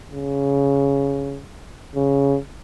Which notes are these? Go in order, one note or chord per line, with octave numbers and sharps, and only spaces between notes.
C#3
C#3